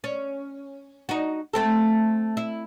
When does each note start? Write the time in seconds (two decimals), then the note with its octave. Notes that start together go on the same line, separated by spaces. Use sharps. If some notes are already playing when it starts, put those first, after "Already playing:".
0.04 C#4
1.09 D#4 F#4
1.53 A3 C4 A4
2.37 E4